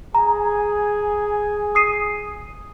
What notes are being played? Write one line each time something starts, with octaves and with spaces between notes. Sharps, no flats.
G#4 G#5 A#5
D#6 C7 D#7